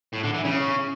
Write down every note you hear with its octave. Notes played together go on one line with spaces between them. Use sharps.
A2
D3
E3
C#3